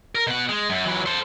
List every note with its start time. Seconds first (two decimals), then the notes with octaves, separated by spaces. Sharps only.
0.15 A#4
0.27 B2 F#5
0.49 G#3
0.69 F#2
0.85 E3 F#3
1.06 A4 C5